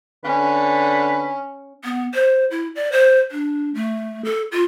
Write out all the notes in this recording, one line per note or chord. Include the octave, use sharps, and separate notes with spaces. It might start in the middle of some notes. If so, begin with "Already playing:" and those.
D3 C#4 B4
B3
C5
E4
D5
C5
D4
A3
A4
F4